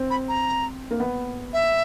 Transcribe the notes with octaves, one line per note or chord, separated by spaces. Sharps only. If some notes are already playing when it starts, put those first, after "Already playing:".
Already playing: C4
B5
A#5
A#3
B3
E5